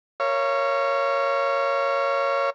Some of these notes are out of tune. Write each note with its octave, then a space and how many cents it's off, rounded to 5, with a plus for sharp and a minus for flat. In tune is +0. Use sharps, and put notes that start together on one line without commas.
A#4 +0 C#5 +0 F5 -35